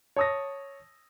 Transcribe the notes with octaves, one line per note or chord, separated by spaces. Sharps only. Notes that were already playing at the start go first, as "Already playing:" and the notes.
C#5 A5 D#6 E6 A#6